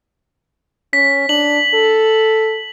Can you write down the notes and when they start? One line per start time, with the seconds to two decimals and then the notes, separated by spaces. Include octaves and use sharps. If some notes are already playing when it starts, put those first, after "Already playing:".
0.93 C#4 B6
1.29 D4 F#7
1.74 A4